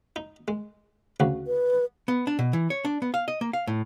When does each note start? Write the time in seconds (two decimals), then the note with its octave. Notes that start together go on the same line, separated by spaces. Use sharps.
0.16 D#4
0.48 G#3
1.20 D2 C#3 F#4
1.47 B4
2.08 B3
2.27 D4
2.39 B2
2.53 E3
2.70 C#5
2.85 D4
3.02 B3
3.14 F5
3.28 D#5
3.41 A#3
3.53 F5
3.67 A2